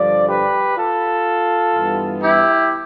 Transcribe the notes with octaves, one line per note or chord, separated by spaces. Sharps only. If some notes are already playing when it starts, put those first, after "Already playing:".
Already playing: G2 D3 F3 D5
G4 B4
F4 A4
G2 E3 B3
E4 G4